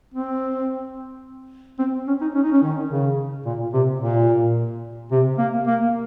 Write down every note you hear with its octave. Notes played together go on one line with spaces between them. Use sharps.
C4
C4
C#4
D#4
C#4
D#4
C#4
D#3
C#3
A#2
C3
A#2
C3
A#3
A#3